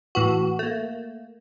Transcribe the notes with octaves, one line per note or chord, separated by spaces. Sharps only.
A2 E3 F#4
A3 A#3